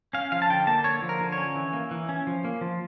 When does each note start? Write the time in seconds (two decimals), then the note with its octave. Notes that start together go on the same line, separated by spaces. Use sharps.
0.13 C#4 F5
0.32 F3 F5
0.42 A5
0.50 D3 G5
0.67 A#3 A5
0.84 D3 C#5
1.02 F3
1.09 A#4
1.20 D3
1.32 C#5
1.38 C#4
1.55 E3
1.73 A#3
1.91 E3
2.09 C#4
2.27 F3
2.45 A#3
2.61 F3